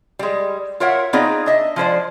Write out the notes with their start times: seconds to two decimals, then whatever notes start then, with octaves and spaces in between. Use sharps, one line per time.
0.19 G3 G#3
0.80 F4 A#4 C#5 E5 F#5
1.13 B3 C4 D#4 F4 G#4 D5
1.46 D4 D#5 E5
1.76 F3 G#3 C5 D5